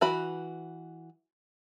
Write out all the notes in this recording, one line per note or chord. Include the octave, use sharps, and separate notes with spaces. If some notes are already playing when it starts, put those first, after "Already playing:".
E3 F#4 B5